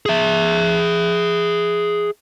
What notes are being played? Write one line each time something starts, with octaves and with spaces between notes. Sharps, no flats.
G#4 E5